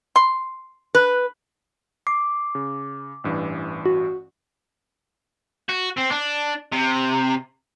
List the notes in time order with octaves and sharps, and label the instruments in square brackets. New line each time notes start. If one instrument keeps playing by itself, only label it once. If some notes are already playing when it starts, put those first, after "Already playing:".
[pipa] C6
[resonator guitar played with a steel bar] B4
[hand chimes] D6 [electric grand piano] C7
[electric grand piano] C#3
A1 G2 E3
[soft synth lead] F#4
[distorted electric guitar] F#4
C4
D4
C3